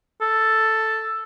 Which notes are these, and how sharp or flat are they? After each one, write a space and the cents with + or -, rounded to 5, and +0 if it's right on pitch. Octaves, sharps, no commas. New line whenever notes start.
A4 +5